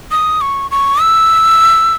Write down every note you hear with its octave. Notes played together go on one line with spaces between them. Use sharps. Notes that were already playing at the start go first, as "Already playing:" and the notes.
D#6
C#6
C#6
E6